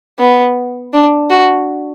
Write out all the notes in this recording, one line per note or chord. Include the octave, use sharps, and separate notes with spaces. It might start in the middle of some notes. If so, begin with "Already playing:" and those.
B3
D4
F#4